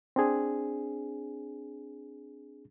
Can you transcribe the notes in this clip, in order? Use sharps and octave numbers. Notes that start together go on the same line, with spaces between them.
C4 D4 G#4